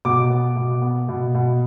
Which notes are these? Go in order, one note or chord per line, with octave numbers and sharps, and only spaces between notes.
B2 D6
B3
B2
B3
B2
B2